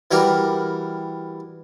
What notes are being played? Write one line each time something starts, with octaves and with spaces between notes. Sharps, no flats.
E3 G3 F#4 G4 A#4